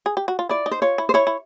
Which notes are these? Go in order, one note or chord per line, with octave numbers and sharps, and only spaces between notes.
G#4
G4
F#4
F4
E4 D5
D#4
C5
F4 C#5
E4
C5
E4 C#5
E4